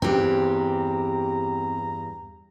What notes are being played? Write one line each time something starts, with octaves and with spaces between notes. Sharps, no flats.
E2 G2 C4 G4 A#5